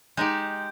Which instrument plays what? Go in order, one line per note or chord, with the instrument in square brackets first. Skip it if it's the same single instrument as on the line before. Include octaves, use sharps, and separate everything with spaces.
[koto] G#3 D#4 G4 [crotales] G6